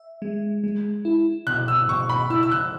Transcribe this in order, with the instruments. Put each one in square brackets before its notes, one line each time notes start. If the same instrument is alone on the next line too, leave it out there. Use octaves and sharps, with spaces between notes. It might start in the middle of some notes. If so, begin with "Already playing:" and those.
Already playing: [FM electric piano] E5
G#3
G#3
E4
[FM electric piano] B2 [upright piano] F#6
[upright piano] E6
[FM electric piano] B2 [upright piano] C#6
[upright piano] B5
[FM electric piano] E4 [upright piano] E6
[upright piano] E6
F#6